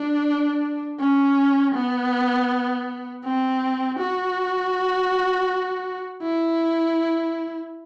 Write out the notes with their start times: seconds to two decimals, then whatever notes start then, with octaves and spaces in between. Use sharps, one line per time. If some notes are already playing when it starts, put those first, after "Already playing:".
Already playing: D4
1.00 C#4
1.75 B3
3.24 C4
3.99 F#4
6.23 E4